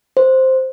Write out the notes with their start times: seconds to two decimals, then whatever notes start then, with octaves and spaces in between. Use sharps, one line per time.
0.17 C5